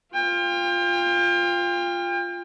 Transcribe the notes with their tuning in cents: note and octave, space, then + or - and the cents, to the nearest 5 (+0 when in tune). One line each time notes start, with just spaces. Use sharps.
F4 +0 G5 +35